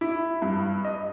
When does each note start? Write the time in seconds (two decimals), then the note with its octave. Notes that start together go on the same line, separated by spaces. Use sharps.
0.01 E4
0.42 G2
0.85 D#5